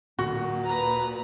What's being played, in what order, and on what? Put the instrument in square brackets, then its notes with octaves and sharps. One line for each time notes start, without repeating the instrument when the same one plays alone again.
[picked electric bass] D1 [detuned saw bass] A#2 [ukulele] F#4
[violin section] B4 A#5